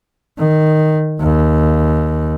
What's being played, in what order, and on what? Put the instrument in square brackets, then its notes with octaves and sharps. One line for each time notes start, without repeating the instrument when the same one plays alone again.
[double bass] D#3
D#2